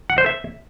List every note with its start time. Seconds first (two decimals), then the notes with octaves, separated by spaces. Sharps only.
0.10 F#5
0.18 C5
0.26 E5